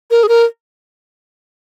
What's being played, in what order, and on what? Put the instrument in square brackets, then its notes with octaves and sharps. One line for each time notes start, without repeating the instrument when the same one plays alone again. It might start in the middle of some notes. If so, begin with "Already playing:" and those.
[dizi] A#4
G#4
A#4